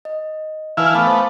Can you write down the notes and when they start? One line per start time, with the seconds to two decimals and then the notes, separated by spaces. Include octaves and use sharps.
0.05 D#5
0.77 E3 E4 B4 F5 G#5 A5
0.95 A3 B3 F5 D6
1.07 C5 F5